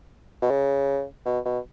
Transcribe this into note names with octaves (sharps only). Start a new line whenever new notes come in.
B2
C#3
B2
B2